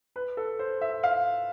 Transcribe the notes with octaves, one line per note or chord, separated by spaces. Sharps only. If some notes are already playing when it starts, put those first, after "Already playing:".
B4
A4
C5
E5
F5